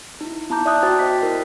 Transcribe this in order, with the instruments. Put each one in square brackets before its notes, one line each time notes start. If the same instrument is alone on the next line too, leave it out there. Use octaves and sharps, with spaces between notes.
[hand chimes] D#4 E4
B3 E4 A5 A#5 D6 G6
D5 E5 A5 D#6 F#6 G6
F#4 C5 G5 D6 A6
C5 D#5 B6
E4 A#4